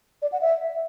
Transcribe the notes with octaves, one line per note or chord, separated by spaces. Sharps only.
D5
F#5
E5